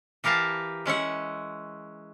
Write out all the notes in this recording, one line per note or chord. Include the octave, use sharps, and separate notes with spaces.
E3 G4 A#4 F5 A5
G#3 C#4 E5 F#5